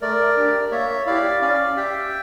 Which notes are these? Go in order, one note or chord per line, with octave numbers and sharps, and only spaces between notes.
A3 A#4 D5
D4 G4
A#3 C#5 E5
E4 G4 D5 F5
C#4 D5 F5
G4 E5 G5